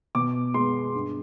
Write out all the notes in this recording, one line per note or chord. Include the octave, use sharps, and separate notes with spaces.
B2 D6
G#3 B3 C6
G2